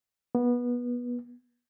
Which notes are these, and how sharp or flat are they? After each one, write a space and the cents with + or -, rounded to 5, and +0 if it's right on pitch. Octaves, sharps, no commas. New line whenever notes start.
B3 -20